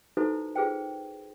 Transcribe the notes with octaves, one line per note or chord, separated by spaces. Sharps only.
D#4 E4 F#4 A4 B4 C5
F4 G#4 B4 C5 G5